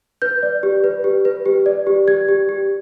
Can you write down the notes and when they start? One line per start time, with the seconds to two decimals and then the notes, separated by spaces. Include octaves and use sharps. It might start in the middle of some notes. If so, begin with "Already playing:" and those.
0.22 B4 G6
0.43 D5
0.63 G4
0.84 B4
1.04 G4
1.25 B4
1.46 G4
1.66 D5
1.87 G4
2.08 G4 G#6
2.28 G4
2.49 G4